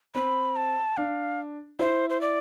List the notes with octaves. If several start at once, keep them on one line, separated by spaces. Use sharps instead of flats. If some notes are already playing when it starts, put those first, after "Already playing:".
C4 B5
A5
D4 F5
E4 C5
C5
D5